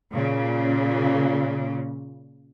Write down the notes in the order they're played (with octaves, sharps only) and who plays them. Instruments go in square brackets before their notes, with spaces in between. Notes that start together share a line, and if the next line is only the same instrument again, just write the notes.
[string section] A#2 C#3